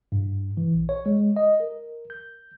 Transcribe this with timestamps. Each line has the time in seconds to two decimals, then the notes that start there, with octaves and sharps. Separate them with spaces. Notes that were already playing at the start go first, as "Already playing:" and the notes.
0.12 G2
0.57 E3
0.74 A#1
0.89 C#5
1.06 G#3
1.36 D#5
1.60 A#4
2.10 G6